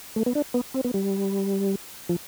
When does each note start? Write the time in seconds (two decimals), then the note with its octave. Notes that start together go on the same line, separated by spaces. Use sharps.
0.16 A3
0.26 B3
0.35 D4
0.54 B3
0.74 C4
0.84 B3
0.94 G3
2.09 F3